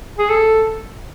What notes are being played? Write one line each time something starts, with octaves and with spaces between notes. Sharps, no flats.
G#4
A4